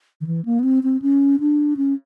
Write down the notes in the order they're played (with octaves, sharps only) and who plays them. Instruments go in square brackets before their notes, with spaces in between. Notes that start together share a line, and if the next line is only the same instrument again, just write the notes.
[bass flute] D#3
E3
A#3
B3
C4
C4
C#4
D4
C#4